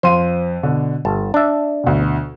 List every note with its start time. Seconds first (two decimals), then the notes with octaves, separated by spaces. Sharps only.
0.03 F2 C5 F5 D#7
0.63 B2 D3
1.05 G1 A5
1.34 D4 E5
1.84 D2 B2